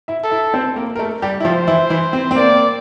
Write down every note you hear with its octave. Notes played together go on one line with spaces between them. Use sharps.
E4 E5
A4
E4 E5
C4 C5
A#3 A#4
A#4
A3 A4
G3 G4
E4
F3 F4 C5
E3 E4
E3 E4
C4
C4
A#3 D5